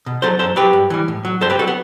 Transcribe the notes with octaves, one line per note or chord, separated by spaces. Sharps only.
B2
F#3 A4 C5
F#2 A4 C5
F#3 G4 B4
G2
E3 G3
A2
F#3
G2 A4 C5
G4 B4
F#3 F#4 A4
B3